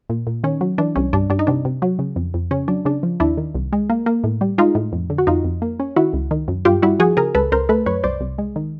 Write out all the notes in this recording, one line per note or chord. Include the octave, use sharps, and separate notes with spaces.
A#2
A#2
D#3 C#4
F#3
E3 D4
C2 C#4
G2 D4
G2 D4
D#4
C3 D4
C3
F#3
C#3
F2
F2
C#3 C#4
F#3 D4
C#3 D4
F3
D#2 D4 E4
D#3
C2
G#3
A#3
A#3
A2
G3
G#3 D#4 F4
A2
F2
D3
F#4
F2 D#4 F4
F2
A#3
C#4
D#3 E4 F#4
C#2
D#3
F#2
G2 F4 G4
G3 E4 F#4
F3 F#4 G#4
C#3 G#4 A#4
C#2 A4 B4
C#2 A#4 C5
A3 A4 B4
F#2 B4 C#5
C2 C5 D5
C2
G#3
D#3